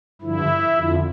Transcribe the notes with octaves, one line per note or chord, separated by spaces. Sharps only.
G2 D3 F3 E4
F2 D3 F3